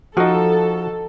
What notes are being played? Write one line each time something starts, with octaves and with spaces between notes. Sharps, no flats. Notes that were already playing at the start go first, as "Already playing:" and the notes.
F3 D#4 F#4 A4